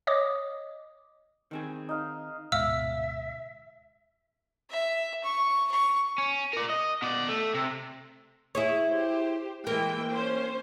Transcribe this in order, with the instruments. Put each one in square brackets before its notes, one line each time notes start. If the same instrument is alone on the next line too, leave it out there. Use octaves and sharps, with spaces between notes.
[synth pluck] C#5 D#5 D6 D#6
[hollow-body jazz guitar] D#3 C4 G#4
[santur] D#4 F5
[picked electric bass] D1 G#2 B2 [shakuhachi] E5 [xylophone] F5 E6 F6
[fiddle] E5
C#6
C#6
[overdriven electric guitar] C#4
A#4 D5
D#5
B2 D5
A3
C3
[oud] E4 G#4 C#5
[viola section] G4 C5
[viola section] E3 G#3 G5 [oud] A#3
[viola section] C#4 C5